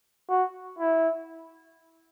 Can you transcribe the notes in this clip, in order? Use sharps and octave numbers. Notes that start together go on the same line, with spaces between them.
F#4
E4